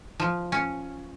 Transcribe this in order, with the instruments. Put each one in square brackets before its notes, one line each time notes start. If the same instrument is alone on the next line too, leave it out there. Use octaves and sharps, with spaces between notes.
[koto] F3
C#4